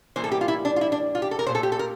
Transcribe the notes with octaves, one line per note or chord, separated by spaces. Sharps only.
A2 E3 G3 A#3 C5
A4
G4
F4
E4
D4
F4
E4
D4
F4
G4
A4
A#4
A#2 A3 C5
A4
G4
A4
A#4